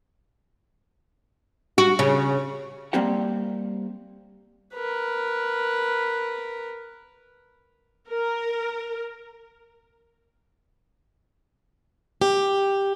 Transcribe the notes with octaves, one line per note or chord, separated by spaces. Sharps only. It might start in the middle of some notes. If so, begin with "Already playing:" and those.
F#4
C#3
G3 A#3 C4 G4 F#5
A#4 B4
A#4
G4